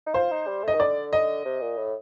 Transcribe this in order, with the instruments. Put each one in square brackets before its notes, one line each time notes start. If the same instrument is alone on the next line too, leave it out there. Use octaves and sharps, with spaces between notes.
[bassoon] D#4
[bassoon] F4 [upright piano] C5
[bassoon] D#4
G3
[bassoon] A3 [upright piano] D#5
[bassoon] D#3
[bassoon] D3 [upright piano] D5
[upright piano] D#5
[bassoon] C3
A#2
A2